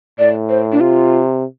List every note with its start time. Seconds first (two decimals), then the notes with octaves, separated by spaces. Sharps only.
0.19 A2 D5
0.49 C5
0.72 D4
0.80 C3 F4